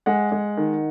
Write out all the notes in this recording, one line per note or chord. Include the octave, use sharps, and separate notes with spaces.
G#3 F#5
G#3
D#3